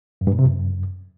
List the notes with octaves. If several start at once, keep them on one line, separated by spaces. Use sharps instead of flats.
F#2
G2
A#2
C3
F#2